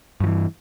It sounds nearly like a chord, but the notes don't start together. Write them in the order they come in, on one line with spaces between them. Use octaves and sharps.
G2 F3 E3